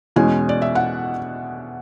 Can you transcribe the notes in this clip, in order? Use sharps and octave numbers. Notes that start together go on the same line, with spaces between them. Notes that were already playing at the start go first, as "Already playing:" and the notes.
E2 B2 G#3 C#4 G#5
D5
E5
F#5